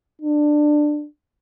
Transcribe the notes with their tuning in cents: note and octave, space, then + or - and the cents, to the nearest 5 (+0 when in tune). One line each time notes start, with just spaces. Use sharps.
D4 +15